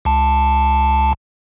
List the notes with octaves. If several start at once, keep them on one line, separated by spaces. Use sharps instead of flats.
C#2 A5